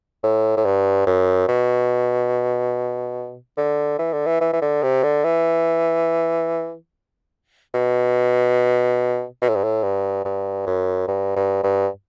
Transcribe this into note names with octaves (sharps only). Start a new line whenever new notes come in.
A2
A2
G2
F#2
B2
D3
E3
D3
E3
E3
E3
D3
C3
D3
E3
B2
B2
A2
G2
A2
G2
G2
F#2
G2
G2
G2